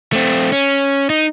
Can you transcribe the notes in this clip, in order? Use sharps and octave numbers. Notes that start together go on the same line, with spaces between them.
A3 C4
C#4
D#4